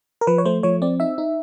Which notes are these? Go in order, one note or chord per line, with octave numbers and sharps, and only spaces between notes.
A#4
F3 B4
C#5
A3 C5
F3 C#5
C4 D5
D#4 E5
D#4